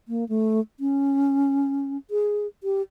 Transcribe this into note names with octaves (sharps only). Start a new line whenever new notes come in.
A#3
A3
C#4
G#4
G4